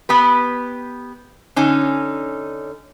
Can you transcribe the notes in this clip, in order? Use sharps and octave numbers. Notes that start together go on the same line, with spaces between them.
B3 G4 B4
D3 C#4 D#4